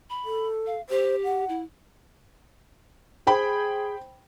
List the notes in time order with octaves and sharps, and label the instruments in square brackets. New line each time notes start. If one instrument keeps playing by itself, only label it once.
[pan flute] B5
[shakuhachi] A4
[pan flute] F5
[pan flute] G4 [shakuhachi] C5
[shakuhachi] F#5
[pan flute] E4
[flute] G#4 [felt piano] C5 G5 B5